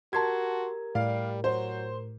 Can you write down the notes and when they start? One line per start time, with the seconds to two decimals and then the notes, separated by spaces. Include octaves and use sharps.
0.13 F#4 G4 A#4 A5 A#5 C6 G#6
0.95 A2 G3 D5 F5
1.44 F#3 C5